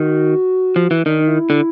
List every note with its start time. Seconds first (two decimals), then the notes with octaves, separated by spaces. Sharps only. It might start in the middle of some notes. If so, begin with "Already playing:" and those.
Already playing: D#3 F#4
0.76 F3
0.91 E3
1.05 D#3 D4
1.22 D#4
1.28 E4
1.50 D3